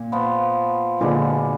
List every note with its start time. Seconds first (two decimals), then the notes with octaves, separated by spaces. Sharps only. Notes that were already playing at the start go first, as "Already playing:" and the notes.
Already playing: A#2
0.12 F3 B3 F4
1.00 A#2 D3 G#3 B3 D4 F#4